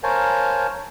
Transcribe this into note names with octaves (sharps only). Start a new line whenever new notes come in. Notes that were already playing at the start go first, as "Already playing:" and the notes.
A#4 C5 C#5 F5 G#5 A5